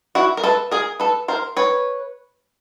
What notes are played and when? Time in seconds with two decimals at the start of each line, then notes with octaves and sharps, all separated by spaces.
0.15 E4 F#4
0.37 A#4
0.43 A4 B4
0.71 G#4 A#4
1.00 A4 B4
1.28 A#4 C5
1.57 B4 C#5